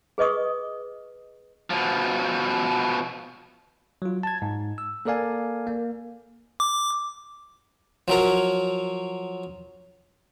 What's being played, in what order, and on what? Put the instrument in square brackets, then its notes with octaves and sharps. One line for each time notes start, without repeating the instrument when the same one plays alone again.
[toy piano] G#4 B4 D#5 C#6 D#6
[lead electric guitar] B2 F3
[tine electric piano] F#3 F4
A5 G#6
G#2
E6
A#3 A4 A#4 D5 F5 G#5
A#3
[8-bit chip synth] D6
[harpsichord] F3 F#3 A#4